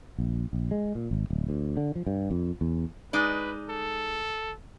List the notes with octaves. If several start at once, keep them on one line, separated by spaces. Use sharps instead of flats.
A#1
A#1
G#3
A#2
G#1
D1
D2
D3
F3
G2
F2
E2
G#3 D#4 B4 D5
A4